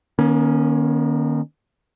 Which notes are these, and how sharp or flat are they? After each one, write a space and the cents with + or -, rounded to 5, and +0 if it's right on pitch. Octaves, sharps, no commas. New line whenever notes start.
D#3 -25 A#3 +40 C#4 +0